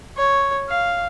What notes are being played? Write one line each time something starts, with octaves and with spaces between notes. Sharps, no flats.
C#5
F5